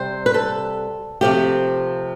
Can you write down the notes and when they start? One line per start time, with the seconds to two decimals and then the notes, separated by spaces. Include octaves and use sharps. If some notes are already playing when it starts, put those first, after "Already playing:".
Already playing: C3 G3 C5
0.26 B4
0.34 A4
1.21 C3 F3 A3 G4